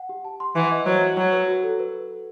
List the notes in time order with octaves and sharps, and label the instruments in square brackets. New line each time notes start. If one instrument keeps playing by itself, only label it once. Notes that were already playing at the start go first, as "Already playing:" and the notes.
Already playing: [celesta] F#5
G4
A5
C6
[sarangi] E3 [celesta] F#5
[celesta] D#5
[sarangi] F#3 [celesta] C5
[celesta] F#4
[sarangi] F#3 [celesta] F#4
[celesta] B4
F#4
A4
B4